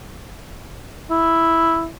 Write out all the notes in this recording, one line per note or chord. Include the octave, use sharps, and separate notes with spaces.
E4